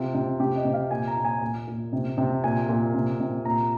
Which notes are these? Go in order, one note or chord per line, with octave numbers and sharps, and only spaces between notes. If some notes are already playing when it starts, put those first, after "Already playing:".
Already playing: C3 F4
C3
C3 G4
D#5
C3
F5
A#2 G#5
A#5
A#2
G#5
A#2
A#2
C3
C3
A#2 G#5
A#2
C3
C3
A#2 A#5